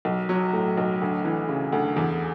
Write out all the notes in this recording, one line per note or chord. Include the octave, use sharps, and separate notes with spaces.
B1
F#3
A2
B1
D2
E3
C#3
D2
E2